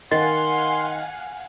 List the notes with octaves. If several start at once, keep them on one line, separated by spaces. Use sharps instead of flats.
D#3 D#5 F5 F#5 G#5 C6